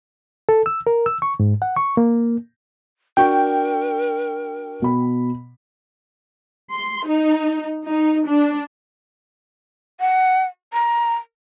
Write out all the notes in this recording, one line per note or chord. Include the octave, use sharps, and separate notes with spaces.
A4
E6
A#4
E6
C#6
G#2
F#5
C#6
A#3
D4 F#4 A#4 G5 C#6
B2 B5
C6
D#4
D#4
D4
F#5
A#5